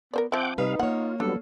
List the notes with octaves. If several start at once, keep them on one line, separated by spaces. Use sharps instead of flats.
B3 A#4 C5 D5
F3 C4 E5 F#5 G5 D6
C3 G3 D#4 B4 F5
A#3 F4 C#5 F#5
F#3 G3 B3 D4 A4